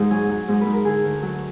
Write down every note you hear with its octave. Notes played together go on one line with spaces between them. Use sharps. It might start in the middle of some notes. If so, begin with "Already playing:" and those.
Already playing: G#2
F#3 G#4
F#3
G#2
G#2 B4
A#4
D3 G#4
D2
F#3